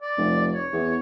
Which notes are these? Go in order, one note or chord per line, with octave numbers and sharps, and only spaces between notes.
D5
F1
C#5
E2